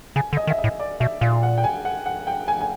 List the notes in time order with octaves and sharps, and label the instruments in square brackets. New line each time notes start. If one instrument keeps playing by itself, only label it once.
[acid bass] C#3 [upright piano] G#5
[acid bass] D3
[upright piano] D#5
[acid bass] D#3
[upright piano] E5
D#5
[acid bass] A2
[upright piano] D5
[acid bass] B2 [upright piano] E5
[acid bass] A#2 [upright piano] F5
[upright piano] F#5
G5
G#5
F#5
F#5
G5
G#5
G#5